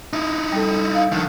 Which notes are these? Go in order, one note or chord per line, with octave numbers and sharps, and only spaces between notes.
D#4 E4
G3 A4
F5
D3 D#3 F3